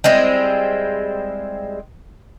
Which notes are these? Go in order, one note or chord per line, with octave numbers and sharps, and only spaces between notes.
G3 G#3 C4 E4